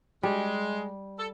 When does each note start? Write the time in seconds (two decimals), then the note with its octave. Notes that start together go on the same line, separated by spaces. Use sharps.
0.23 G3 G#3
1.18 A4